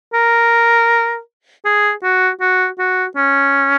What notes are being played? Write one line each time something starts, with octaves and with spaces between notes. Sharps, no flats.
A#4
G#4
F#4
F#4
F#4
C#4